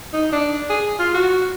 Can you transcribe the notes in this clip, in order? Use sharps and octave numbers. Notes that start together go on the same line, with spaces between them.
D#4
D4
G#4
F4
F#4